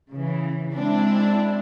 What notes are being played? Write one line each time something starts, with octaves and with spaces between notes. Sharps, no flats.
C#3 E3
G#3 C4 D4 E4